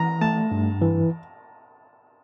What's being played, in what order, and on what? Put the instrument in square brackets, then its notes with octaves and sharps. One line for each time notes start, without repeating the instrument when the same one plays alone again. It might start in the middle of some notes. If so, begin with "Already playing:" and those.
Already playing: [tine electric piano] E3 [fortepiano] A#5
[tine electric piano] A3 [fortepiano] A5
[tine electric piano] G2
E3